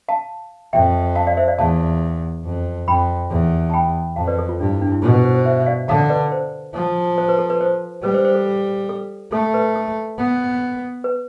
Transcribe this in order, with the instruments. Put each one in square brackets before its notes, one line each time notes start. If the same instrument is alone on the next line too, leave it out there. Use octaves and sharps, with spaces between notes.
[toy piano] F5 A5
[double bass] F2 [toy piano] E5 G5
[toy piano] F5 A5
D5 F5
C5 E5
D5 F5
[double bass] E2 [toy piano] F5 A5
[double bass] F2
[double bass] F2 [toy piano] G5 B5
[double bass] E2
[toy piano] A5
G5 B5
[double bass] F2 [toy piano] F5 A5
[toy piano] B4 D5
A4
F4
[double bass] G2 [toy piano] D4
[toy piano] E4
D4
E4
[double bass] B2 [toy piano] F4
[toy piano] B4
C5
C5
C5 E5
E5
D5 F5
[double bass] D3 [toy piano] F5 A5
[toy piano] B4 D5
C5
[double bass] F3
[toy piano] C5
B4
A4
B4
C5
[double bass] G3 [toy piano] B4
[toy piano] C5
C5
A4
A4
[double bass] A3 [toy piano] A4
[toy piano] B4
A4
[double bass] B3
[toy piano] B4